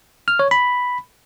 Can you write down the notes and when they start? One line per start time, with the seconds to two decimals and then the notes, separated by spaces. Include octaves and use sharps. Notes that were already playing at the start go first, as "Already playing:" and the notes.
0.28 F6
0.39 C#5
0.51 B5